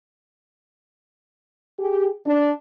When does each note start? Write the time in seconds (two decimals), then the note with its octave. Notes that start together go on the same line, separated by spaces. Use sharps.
1.79 G4 G#4
2.25 D4